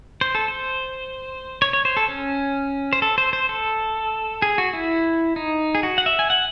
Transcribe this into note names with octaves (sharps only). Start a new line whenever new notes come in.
C5
A4
C5
C#5
C#5
C5
A4
C#4
C5
A4
C5
C5
A4
G#4
F#4
E4
D#4
G#4
F#4
F#5
E5
G#5
F#5